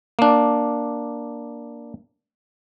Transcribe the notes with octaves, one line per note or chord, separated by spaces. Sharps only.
A#3 D4